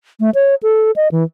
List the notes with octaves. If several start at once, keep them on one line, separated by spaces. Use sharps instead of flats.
A3
C#5
A4
D#5
E3